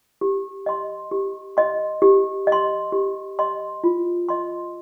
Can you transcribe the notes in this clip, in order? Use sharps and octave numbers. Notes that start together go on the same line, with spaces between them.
G4
D#5 C6
G4
D#5 C6
G4
D#5
C6
G4
D#5 C6
F4
D#5 C6